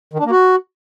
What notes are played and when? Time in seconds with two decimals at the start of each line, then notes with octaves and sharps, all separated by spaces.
0.14 D#3
0.19 D4
0.25 A#3
0.31 F#4